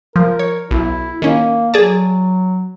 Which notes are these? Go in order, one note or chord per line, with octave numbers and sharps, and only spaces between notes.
F3 A#4
C#5
B1 E4
D#3 A#3 C#4
F#3 G#4 D5 A5